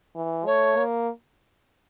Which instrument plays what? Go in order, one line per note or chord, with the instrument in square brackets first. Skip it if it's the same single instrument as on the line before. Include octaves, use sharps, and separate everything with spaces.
[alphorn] E3
[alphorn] A3 [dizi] C#5
[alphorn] A#3